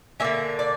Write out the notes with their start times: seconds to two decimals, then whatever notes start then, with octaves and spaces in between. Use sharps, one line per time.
0.20 D3 A#3 C#4 E5
0.59 D5